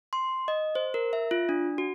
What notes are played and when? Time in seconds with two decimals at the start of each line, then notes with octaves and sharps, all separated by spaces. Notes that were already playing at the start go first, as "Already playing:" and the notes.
0.13 C6
0.48 D#5
0.75 C5
0.94 A#4
1.13 E5
1.31 F4
1.49 D4
1.78 F#4